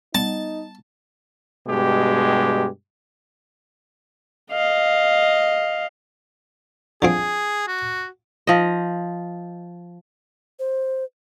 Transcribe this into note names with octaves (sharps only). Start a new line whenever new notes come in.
G3 B3 D#4 F#5 A5
G2 B2 G#3 G4
D#5 F5
D3 F3 C4 G#4
F#4
F3 D#5
C5